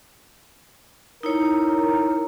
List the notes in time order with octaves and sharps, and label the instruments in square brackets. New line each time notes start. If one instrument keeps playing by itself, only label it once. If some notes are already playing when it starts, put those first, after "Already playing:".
[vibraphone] D#4 E4 C#5 [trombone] A#4